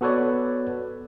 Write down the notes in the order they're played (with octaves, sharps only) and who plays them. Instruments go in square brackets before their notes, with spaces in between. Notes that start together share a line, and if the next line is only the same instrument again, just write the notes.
[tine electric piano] B3 F#4 A4 B4 C#5 D5